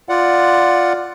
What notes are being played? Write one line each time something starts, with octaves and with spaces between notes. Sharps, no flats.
F4 D5 F#5